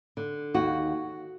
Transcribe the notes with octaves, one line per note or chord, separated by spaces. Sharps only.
D3
D#2 F#4